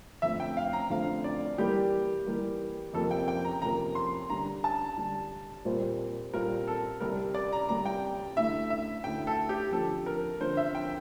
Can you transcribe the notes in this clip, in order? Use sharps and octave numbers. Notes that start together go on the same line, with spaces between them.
F2 D3 F3 A3 C4 E5
G5
F5
A#5
F2 D3 F3 A3 C4 F5
D5
E3 G3 A#3 G4
E3 G3 A#3
F2 C3 F3 A#3 A4
G5
G5
A#5
F2 C3 F3 A#3 A#5
C6
D3 G3 D4 A#5
A5
D3 G3 D4
A#2 G3 C4 F4 C5
A#2 G3 C4 F4 A#4 C5
A4
C2 C3 G3 A#4
D5
A#5
C2 C3 G3 A#5
G5
D2 D3 A3 E4 E5
E5
D2 D3 A3 E4 G5
A4
G4
D3 F3 C4 A4
A#4
D3 F3 C4 C5
E5
G5